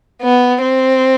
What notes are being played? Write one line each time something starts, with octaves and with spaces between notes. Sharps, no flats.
B3
C4